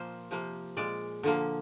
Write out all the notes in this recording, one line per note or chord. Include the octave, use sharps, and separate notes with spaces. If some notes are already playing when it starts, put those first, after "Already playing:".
Already playing: A#2 F3 A#3 C5
C3 F3 A#3
A#2 G#3 D5
D3 F3 A#3